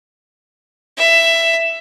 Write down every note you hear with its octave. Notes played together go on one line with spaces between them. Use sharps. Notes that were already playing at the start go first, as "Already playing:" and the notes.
E5